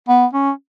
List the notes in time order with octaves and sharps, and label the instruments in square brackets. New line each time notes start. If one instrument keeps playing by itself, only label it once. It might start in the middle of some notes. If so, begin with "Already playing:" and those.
[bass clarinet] B3
C#4